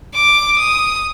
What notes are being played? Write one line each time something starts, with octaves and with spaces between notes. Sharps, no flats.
D6
D#6